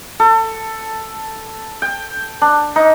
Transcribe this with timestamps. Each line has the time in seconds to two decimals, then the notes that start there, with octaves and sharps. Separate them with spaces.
0.20 A4
1.82 G5
2.41 D4
2.76 D#4